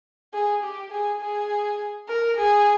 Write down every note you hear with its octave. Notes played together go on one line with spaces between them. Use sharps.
G#4
G4
G#4
G#4
A#4
G#4